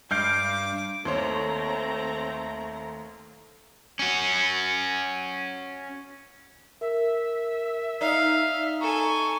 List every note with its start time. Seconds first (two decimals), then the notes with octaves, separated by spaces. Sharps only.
0.11 G2 D6 F6 G6 C7
1.05 D#2 A3 C4 C5 C#5 A#5
3.99 C#4 F#4
6.81 A#4 E5
8.01 D#4 D5 F5
8.81 A4 G#5 A#5 C#6